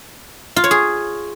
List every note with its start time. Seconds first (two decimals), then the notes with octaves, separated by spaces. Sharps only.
0.56 F4
0.64 C#5
0.71 G#4